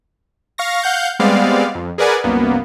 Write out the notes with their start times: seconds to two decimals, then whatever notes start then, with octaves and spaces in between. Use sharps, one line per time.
0.58 F5 C#6 A#6
0.83 F5 F#5 G6
1.19 G3 G#3 B3 C4 D5 F5
1.75 F2
1.98 G#4 A#4 B4 D5 F#5 G#5
2.24 C2 F#2 A#3 B3